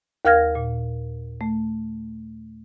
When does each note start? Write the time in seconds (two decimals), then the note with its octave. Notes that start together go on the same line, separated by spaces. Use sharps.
0.25 D#2 A#4 F5 F6 G#6 A#6
0.55 A#2
1.41 A3